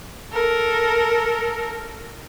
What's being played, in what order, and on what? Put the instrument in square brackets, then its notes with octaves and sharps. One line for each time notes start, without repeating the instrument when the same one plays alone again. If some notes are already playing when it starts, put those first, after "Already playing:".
[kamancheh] A4 A#4